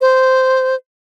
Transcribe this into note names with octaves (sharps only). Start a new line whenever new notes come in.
C5